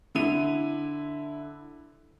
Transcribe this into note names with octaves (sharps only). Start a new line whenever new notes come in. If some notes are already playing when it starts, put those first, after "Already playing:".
D3 E4 D#7